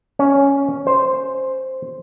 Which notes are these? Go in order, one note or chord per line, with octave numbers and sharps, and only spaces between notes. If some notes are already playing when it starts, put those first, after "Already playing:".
C#4
C5